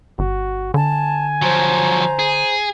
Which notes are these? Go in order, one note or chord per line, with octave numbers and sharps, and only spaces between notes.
G1 F#4
D3 G#5 A5
F3 F#3 C5 A#5
G#4